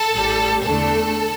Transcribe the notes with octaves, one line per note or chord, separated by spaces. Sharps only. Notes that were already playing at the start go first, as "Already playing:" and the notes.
Already playing: A4
A1 A2 G3
E2 D3 A3 D4 A4